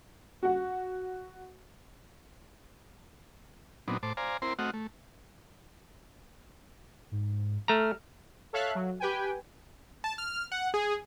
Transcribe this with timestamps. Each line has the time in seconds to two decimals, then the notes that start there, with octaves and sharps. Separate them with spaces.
0.43 F#4 F#5
3.88 A#2 F#3 B3 C4 D4 D#4
4.03 A2 C5 A5 D6
4.17 C5 D5 F5 G#5 A#5
4.42 C4 E4 A#4 C5 C6
4.59 A3 C4 F#4 D#5 F#5 F6
4.74 A3
7.11 G#2
7.68 A3 A#5 F6
8.53 A4 C#5 E5 F5 F#6
8.75 F#3
9.00 G4 B4 G5 G#5
10.04 A5
10.18 F6
10.52 F#5
10.74 G#4